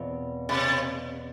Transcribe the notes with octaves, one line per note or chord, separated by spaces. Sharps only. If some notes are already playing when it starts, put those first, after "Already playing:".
Already playing: E2 B2 C4 F4
C3